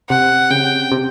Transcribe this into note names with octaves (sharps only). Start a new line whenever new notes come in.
C3 F#5
C#3 G5
C3